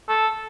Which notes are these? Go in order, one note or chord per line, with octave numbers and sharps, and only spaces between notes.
A4